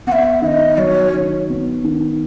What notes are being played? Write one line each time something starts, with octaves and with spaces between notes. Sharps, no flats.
B3 E5 F#5
D#3 D#5 E5
F#3 C#5
D#3
B3
D#3